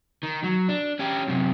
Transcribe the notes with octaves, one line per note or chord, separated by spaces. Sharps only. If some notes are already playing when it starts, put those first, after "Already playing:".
D#3
F#3
D4
C#4 G4
F#2 C3